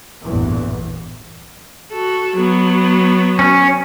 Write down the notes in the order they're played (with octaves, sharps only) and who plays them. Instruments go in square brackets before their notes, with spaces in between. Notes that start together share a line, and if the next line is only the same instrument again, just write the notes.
[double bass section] A1 E2 G2 A#2 E3
[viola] F#4 A4
F#3 B3
[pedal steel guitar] C#4